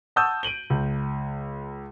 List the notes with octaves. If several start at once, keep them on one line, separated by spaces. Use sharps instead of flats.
F#5 A5 C#6 D#6 E6 G6
D7 D#7 F#7 G7
C#2